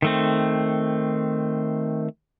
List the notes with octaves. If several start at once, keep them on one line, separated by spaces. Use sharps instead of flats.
D#3 A3 C4